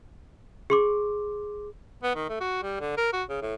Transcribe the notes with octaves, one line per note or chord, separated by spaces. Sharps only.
G#4 C6 D6
B3
D#3
A3
F#4
G3
D3
A#4
F#4
C#3
A2